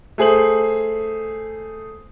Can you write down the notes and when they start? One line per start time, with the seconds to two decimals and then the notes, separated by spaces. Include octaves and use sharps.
0.18 A3 G#4 C5 F#7